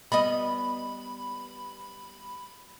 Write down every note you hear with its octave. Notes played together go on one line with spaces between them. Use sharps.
G3 B3 D#5 B5